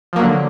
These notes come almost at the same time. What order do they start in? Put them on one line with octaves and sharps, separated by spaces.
F3 A#3 F#3 D3